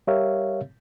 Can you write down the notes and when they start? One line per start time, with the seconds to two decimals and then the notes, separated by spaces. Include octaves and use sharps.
0.07 G3 G4 A#4 C#5 E5 F5